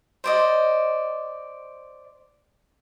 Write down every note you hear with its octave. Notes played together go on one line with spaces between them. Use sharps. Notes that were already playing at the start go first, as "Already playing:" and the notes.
C5 D5 D#5